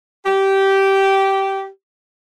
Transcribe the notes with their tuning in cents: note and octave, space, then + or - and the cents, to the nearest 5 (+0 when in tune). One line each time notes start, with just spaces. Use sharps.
G4 -15